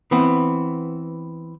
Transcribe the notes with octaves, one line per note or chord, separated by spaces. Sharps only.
E3 B3 C4